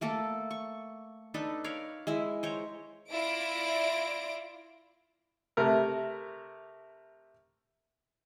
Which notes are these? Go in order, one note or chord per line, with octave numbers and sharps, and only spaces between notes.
A3 A#3 A4
C#6
D4 D#4 A4 B4
A#4 C#5 F5 B5
G#3 E4 E5
C5 C#5 A#5
E4 F4 D5 A#6 D7
C3 A3 A#4